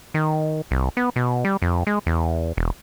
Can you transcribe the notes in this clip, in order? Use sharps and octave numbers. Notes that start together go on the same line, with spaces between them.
D#3
C2
B3
B2
G3
F2
G#3
E2
E1